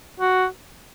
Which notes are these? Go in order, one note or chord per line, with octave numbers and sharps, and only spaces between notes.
F#4